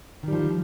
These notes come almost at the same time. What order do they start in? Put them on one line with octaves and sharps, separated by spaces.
D#3 G3 F3